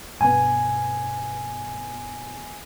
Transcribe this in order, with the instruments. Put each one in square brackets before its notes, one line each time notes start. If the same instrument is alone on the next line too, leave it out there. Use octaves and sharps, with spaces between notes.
[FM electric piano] G2 B2 B3 [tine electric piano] G#5